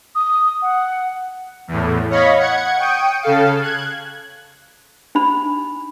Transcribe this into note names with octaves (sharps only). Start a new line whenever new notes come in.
D#6
F#5
E2 A2
C#5 D#5 F5 B5 C#6
F#5 G#6 C#7
G5 C#6 D#6
C#3 A4 F5
F#6 G#6
D4 D#4 B5